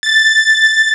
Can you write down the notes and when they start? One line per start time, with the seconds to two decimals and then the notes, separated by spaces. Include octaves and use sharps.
0.03 A6